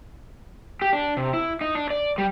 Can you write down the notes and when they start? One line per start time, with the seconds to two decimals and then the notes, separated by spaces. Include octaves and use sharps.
0.82 G4
0.93 D4
1.17 C3
1.34 E4
1.61 D#4
1.75 D4
1.90 D5
2.18 G3